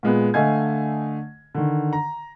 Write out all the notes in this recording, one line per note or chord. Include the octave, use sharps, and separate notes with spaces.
A#2 G#3 B3
D3 A3 D#5 F5 G#5 G#6
D3 D#3
A#5